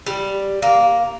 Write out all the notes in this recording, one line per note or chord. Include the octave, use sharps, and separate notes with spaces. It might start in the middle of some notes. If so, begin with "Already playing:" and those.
G3
A#3